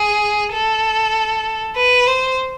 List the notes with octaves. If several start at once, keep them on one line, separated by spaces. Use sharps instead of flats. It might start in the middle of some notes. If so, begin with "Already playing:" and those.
Already playing: G#4
A4
B4
C5